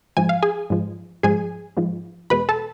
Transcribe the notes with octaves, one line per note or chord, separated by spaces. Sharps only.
G#2 F3 G#3 G#5
F5
G#4 G#5
G#2 F3 G#3
G#2 F3 G#3 G#4 G#5
G#2 F3 G#3
E2 B2 G#3 B4 B5
A4 A5